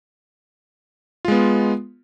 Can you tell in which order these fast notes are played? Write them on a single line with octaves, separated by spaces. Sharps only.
F4 G#3 B3